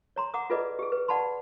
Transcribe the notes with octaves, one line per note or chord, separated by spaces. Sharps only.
C#5 A#5 C6
F#5 A#5 D6 D#6
F4 G#4 A4 B4 D5 D#5
G4 G#4
B4
D5 F#5 A5 B5 C6